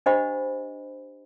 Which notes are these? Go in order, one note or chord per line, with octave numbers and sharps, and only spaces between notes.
D4 G4 C5 D#5 F#5 B5